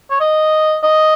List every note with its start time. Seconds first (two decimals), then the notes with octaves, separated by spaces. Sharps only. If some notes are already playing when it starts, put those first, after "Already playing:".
0.10 C#5
0.20 D#5
0.83 D#5